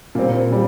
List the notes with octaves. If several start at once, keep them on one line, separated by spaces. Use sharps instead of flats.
A#2 G3 C4
A#2 G3